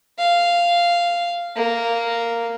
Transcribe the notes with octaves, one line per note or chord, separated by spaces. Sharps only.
F5
A#3